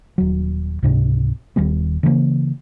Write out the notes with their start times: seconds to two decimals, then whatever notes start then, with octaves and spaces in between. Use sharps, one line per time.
0.18 D#1 F#3
0.83 C#2 G#2 C3 D4
1.56 D#1 D#3 G3 B3
2.03 C#3 E3 F#3 A#3